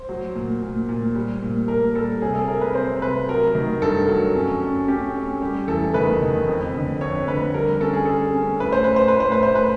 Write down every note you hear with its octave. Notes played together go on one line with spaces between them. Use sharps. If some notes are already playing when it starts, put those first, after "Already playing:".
Already playing: C5
F#3
A#2
A#2
A#2
G3
A#2
A#2 A#4
G3 A4
C3 G#4
A4
C3 A#4
B4
C4 C5
C3 B4
F#3 A#4
D#3
G2 A4
F#3
C#4
C#4
C#4 G4
C#4
G3 G4
E2 A4
D#3 B4
D#3
F2
D3
F2 C#5
D3 B4
G3 A#4
C#4 A4
G#4
G3 A4
C#4
A2 B4
C5
A2 B4
C5
B4
A2
C5
B4
A2 C5
B4